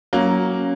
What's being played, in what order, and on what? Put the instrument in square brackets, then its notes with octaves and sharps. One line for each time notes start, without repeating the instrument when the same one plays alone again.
[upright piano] F#3 A#3 [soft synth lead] C#4